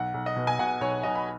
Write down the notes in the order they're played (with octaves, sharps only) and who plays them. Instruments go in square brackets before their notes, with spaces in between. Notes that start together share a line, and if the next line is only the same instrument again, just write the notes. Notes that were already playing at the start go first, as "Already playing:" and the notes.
Already playing: [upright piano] B1 F#5
B1
D#5
B2
G#5
B2 F#5
B1 C#5
B1 D#5
B5